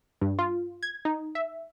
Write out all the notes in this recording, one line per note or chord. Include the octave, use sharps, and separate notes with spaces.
G2
F4
G#6
D#4
E5